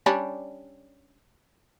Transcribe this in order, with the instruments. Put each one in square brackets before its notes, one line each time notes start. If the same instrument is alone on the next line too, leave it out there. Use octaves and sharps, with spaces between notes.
[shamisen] G3 C#4 D4